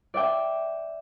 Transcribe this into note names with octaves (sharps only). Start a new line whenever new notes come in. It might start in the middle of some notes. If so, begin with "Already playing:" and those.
D5 E5 G5